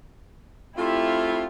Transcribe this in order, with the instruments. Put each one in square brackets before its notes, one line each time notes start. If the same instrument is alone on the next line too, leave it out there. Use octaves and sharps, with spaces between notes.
[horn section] A3 C4 F4 [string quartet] E4 G4 E5